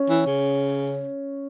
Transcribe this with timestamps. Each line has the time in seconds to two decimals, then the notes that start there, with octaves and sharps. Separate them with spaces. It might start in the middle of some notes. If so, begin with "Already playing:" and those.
Already playing: C#4
0.10 E3
0.26 C#3